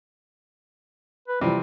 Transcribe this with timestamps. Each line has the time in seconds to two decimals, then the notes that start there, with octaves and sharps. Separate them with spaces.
1.28 B4
1.41 C3 E3 F3 G3